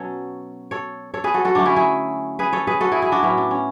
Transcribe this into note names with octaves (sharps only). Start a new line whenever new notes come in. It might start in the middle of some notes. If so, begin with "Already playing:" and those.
Already playing: B2 F#3 C#4 A4 C#5
A4 C#5
A4 C#5
G#4 B4
F#4 A4
F#4 A4
D3 F#3 A3 C#4 D4
C#4 E4
E4 G#4
G#4 B4
A4 C#5
G#4 B4
F#4 A4
E4 G#4
E4 G#4
D4 F#4
A2 F#3 B3 C#4 E4
D4
C#4